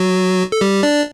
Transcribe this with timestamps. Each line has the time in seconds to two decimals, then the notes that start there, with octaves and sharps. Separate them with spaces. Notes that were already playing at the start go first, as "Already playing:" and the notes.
Already playing: F#3 F#4
0.52 A4
0.61 G3 G4
0.83 D4 D5